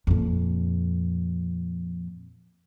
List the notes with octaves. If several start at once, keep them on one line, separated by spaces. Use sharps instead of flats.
F2 A#2